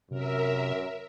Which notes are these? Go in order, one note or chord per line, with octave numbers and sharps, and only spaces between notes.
F#2 C3 A#4 E5